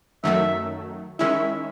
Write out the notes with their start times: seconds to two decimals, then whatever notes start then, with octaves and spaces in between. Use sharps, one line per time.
0.24 F#2 D#3 F#3 A3 E5
1.19 D#3 G#3 C#4 E4 E5